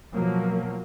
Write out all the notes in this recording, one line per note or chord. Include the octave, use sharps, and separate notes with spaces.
B2 F3 F#3 A#3